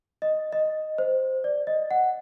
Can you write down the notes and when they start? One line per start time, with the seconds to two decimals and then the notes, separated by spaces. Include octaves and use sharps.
0.22 D#5
0.52 D#5
0.98 C5
1.44 D5
1.67 D#5
1.91 F#5